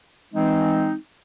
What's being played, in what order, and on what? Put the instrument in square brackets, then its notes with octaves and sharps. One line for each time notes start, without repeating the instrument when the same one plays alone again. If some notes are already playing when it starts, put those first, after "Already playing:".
[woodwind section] E3 G#3 C4 D#4